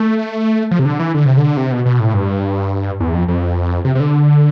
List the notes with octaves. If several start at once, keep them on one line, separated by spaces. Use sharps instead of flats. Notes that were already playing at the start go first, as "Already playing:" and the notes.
Already playing: A3
F3
C3
D3
E3
D3
C3
D3
C3
B2
B2
A2
G2
E2
F2
F2
C3
C3
D3